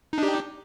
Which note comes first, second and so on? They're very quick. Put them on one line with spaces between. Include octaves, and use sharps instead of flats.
D#4 D4 G4